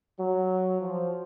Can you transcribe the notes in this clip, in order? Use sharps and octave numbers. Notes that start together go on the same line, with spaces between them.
F#3
F3